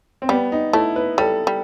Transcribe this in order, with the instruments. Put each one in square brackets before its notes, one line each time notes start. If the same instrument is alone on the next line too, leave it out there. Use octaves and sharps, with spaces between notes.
[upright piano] C4
[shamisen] G3 [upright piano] B3
[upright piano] D#4
[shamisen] A3 [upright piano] E4
[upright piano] B4
[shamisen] G3 [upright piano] A4
[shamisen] G3